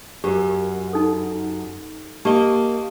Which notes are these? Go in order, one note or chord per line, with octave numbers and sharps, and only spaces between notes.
F#2 G4 A#4
D#4 A4
A#3 G4 D#5 A5